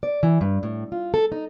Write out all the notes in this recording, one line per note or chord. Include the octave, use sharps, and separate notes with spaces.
D5
E3
G2
A2
F4
A4
D#4